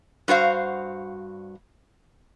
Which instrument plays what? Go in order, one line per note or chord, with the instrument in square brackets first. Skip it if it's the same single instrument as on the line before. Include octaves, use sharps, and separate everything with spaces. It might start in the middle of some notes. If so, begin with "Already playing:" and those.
[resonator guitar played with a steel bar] G2 F#4 C5 F5